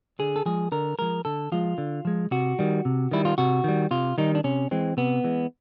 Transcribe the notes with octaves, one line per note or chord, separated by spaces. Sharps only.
D3 G#4
A4
F3 G#3 G#4
D3 A#4
F3 G#3 A#4
D3 A4
F3 G#3 F4
D3
F3 G#3
C3 F#4
D#3 G3
C3
D#3 G3 E4
F4
C3 F#4
D#3 G3
C3 F4
D#3 G3 D#4
D4
C3 C#4
E3 G#3 C4
C3 B3
E3 G#3